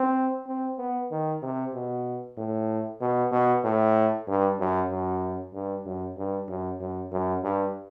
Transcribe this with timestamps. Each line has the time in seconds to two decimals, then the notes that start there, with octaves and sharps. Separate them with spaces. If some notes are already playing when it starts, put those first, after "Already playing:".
Already playing: C4
0.47 C4
0.78 B3
1.11 D#3
1.42 C3
1.74 B2
2.38 A2
3.01 B2
3.32 B2
3.64 A2
4.28 G2
4.59 F#2
4.90 F#2
5.53 G2
5.86 F#2
6.17 G2
6.48 F#2
6.81 F#2
7.12 F#2
7.43 G2